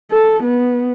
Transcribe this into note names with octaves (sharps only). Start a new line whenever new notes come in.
A4
B3